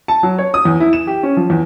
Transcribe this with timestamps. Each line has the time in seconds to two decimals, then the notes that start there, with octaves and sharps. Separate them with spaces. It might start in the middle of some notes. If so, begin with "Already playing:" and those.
0.08 A5
0.23 F#3
0.38 C#5
0.54 D#6
0.65 E2
0.80 E4
0.93 E7
1.07 G4
1.23 C#4
1.37 F3
1.50 E2